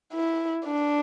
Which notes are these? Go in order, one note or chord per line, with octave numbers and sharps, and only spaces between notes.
E4
D4